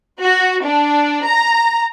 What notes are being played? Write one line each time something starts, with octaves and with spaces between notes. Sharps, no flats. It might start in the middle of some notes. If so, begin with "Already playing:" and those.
F#4
D4
A#5